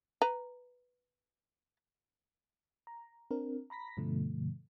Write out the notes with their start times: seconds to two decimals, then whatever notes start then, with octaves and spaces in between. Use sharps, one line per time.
0.22 B4 A#5
2.87 A#5
3.31 C4 D4 A#4
3.70 A#5 B5 A#6 B6
3.97 G2 B2 D3 F3 A3